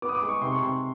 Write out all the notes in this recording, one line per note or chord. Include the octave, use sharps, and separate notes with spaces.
B3 D6
D#6
D6
G#3
C#6
C3 C6
C#6
C3 C6